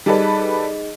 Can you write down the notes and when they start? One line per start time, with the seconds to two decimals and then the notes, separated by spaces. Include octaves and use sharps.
0.06 G3 D#4 G#4 A4 B4 D#5